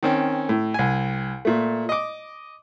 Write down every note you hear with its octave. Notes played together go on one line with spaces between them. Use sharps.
D#3 C4 C#4
A2
C2 G#5
A#2 A3
D#5 D6